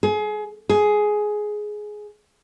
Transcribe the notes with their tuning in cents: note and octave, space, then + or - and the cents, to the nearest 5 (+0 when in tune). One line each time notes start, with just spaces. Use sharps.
G#4 +30
G#4 +10